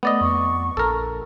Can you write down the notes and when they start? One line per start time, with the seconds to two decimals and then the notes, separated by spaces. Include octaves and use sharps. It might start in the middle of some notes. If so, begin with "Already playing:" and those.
0.03 A3 B3 D5 D#5
0.21 F2 C#6
0.77 A#1 A4 A#4